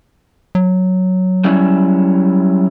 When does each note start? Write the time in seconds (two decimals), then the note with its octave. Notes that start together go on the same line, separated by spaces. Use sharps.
0.55 F#3
1.44 G3 C#4 E4